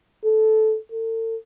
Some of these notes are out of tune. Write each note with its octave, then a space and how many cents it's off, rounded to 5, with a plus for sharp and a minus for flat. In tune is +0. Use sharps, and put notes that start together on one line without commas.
A4 -10
A4 +40